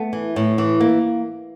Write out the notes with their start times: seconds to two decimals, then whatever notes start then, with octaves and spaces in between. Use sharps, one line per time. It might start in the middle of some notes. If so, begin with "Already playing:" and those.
Already playing: A3 B3
0.13 E3
0.36 A2
0.58 E3
0.81 A#3